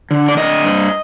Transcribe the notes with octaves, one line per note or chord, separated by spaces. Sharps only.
D3
D5
D3 D#5
G2